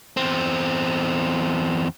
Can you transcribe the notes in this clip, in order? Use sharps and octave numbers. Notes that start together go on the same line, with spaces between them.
E2 C4